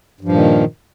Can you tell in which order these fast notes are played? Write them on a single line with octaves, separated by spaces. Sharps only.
G2 F3 A#2 D#3